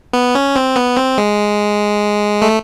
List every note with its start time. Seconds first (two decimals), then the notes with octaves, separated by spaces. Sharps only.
0.13 B3
0.35 C#4
0.55 C4
0.76 B3
0.97 C4
1.18 G#3
2.42 A3